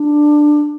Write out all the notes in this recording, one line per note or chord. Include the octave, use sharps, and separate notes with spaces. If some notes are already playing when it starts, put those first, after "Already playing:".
Already playing: D4